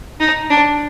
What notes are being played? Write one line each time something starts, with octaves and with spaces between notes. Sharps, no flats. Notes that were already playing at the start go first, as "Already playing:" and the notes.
D#4
D4